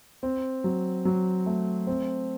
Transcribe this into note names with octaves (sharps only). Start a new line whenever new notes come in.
C4
F#3
F#3
A3
C4